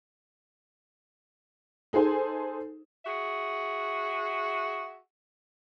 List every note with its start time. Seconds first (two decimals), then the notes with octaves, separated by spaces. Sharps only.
1.93 D#4 G#4 A4 C5 G#5
3.06 F#4 G#4 E5